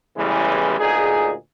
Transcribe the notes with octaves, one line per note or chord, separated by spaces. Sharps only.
A1 E2 C#3 E3 G3 G#3
D2 A#2 D#4 G#4